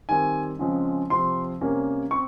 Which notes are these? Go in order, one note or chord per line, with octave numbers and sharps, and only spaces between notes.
D#3 G3 C4 G#5
C#3 F3 G#3 C4
C3 F3 C4 C6
C3 G3 A#3 C#4
C4 C#6